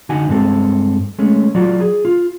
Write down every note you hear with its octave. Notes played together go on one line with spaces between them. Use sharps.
D3 D#4 F#4 G#5
G2 G#3 C4 A4
G#3 A3 C#4
F#3 F4 F#4 D5
G#4
F4